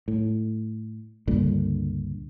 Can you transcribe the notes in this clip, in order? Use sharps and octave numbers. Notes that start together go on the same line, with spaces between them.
A2
C#2 G2 A#2 D3